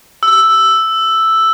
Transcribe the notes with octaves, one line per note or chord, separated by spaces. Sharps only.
E6